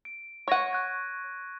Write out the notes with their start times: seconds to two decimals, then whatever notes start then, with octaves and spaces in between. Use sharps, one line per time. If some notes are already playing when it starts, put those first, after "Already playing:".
0.05 D7
0.48 C#5 F#5 C#6 A#6 D#7
0.71 F#6 G#6 A#6